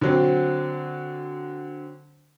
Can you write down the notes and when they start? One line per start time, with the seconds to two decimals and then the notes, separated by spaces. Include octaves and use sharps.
0.01 D3 F#3 C4